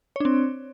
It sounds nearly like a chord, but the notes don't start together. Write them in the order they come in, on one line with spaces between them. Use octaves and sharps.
C#5 D4 C4